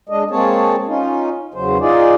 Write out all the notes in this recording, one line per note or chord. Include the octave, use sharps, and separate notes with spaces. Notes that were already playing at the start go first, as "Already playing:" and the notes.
G#3 D4 D#5
G#3 A#3 C4 G#4 C#5 A5
C#4 D#4 F4
E2 C#3 F#3 C5
D#4 F4 G#4 D5